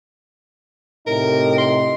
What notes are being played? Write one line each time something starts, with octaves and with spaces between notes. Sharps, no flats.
A2 C3 D#4 A#4
C6